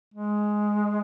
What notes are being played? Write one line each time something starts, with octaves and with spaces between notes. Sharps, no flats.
G#3